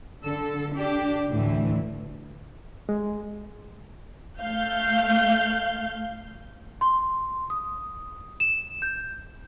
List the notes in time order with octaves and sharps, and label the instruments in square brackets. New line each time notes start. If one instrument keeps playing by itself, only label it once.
[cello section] D3 A4
D4 G4
D2 A2 D3 E3
[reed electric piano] G#3
[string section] A3 F5 G6
[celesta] C6
D#6
E7
G6